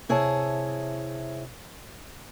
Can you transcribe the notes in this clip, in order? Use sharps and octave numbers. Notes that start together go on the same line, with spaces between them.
C3 E4 G#4 C#5 A5